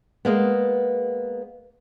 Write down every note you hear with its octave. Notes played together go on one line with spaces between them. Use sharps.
G#3 A#3 B3